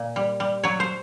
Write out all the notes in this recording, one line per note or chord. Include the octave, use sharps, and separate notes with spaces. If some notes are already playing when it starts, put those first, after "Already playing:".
Already playing: A#2
G3
G3
F#3 C#5
C5